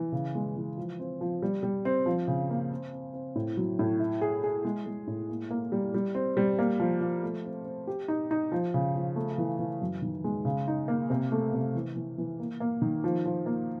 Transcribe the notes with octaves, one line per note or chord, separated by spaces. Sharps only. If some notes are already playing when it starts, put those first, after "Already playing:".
Already playing: E3
C#3
G#3
E3
F3
C4
F3
G3
G3
C4
F3
C#3
A#3
C4
C4
C4
A2
F#3
A2
E4
G#4
G#4
G#3
G#3
A2
A#3
A#3
G3
G3
C4
G3
A#3
F3
F3
A3
C4
C4
G4
D#4
D#4
F3
C#3
F3
A3
E3
E3
F#2
D#3
G#3
C#3
D#4
A#3
C3
A3
C3
E3
E3
E3
A#3
A#3
D#3
F3
F3
A#3